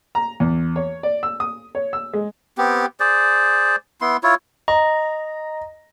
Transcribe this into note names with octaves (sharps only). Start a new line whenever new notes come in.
A#5
E2
C#5
D5
E6
D#6
C#5
E6
G#3
B3 C4 G4
G#4 C5 D5
B3 E4 C6
E4 F4 C#5
D#5 A#5